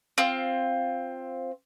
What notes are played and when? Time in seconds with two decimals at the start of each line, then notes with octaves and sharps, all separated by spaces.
0.18 C4 F4